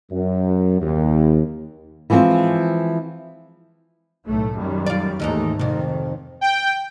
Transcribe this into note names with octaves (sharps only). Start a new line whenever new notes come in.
F#2
D#2
E3 F3 G#3 C4 F4
B1 A2 A3
F#2 D#3 G3
F4 D5
D#2 G#2 D#3 E3 A3 D#4
G#1 F2 C3 D#3
G5